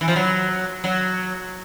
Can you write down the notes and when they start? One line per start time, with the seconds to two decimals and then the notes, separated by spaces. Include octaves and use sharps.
0.01 E3
0.08 F3
0.16 F#3
0.84 F#3